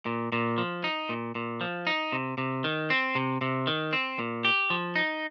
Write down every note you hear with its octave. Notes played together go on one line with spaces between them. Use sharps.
A#2
A#2
F3
D#4
A#2
A#2
F3
D#4
C3
C3
D#3
C4
C3
C3
D#3
C4
A#2
G4
F3
D#4